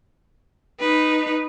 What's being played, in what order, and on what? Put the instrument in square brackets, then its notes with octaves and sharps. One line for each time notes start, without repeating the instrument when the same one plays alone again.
[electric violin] D#4 B4